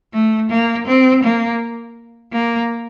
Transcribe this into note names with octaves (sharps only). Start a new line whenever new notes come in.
A3
A#3
C4
A#3
A#3